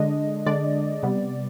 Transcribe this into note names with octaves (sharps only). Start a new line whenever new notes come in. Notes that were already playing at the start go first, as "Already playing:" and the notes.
Already playing: D3 G#3 D4 D#5
D3 G#3 D4 D5
C3 G3 B3